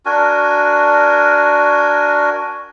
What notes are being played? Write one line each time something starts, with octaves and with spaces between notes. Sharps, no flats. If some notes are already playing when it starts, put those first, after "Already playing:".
D4 F#4 A#4 G#5